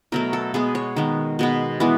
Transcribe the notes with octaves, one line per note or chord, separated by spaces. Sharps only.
B2 F#3 A3 A#4
A4
B2 G#3 B3 G#4
C#5
D#3 G#3 B3
B2 G#3 B3
E3 G#3 B3